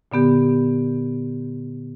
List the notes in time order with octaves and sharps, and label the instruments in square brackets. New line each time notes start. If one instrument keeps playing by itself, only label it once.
[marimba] A#2 D3 B3 G4